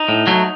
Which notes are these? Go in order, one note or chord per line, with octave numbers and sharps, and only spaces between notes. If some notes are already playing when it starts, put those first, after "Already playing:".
Already playing: D#4
A2
F#3 A3